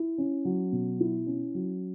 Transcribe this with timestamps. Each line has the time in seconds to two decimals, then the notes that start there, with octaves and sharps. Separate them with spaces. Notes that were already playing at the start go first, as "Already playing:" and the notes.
Already playing: E4
0.18 C#4
0.45 F#3
0.72 B2
1.00 E4
1.27 C#4
1.54 F#3